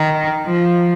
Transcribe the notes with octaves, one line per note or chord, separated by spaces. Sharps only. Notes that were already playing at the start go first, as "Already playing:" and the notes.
Already playing: D#3
F3